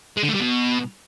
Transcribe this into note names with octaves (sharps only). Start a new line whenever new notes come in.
G#3
D3
A3
G3
B2